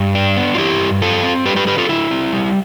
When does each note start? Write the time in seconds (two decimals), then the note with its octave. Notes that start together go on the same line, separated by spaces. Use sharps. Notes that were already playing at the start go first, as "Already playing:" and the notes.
Already playing: G2
0.15 D4
0.37 B3
0.55 F4
0.58 E3 E4 G4
0.80 G2
1.02 D3 F4 A4
1.24 C4
1.45 G3 G4 B4
1.56 G4 B4
1.67 D3 G4 B4
1.78 F4 A4
1.89 D3 E4
2.11 C4
2.33 G3